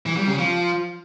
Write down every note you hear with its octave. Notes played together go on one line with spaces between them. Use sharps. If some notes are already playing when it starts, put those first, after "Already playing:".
E3
G3
C#3
F3